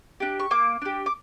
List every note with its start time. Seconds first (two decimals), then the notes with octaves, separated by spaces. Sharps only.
0.20 D4 G4
0.39 C#6
0.51 A#3 D6
0.82 D4 G4
1.06 D6